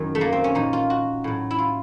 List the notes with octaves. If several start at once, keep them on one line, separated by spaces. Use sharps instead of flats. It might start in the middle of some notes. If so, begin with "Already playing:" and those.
Already playing: F#2 D#3 F#3 E4
A3
A#3
C4
C#4
A#2 F3 D#4
F4
F#4
A2 F#3
E4
F4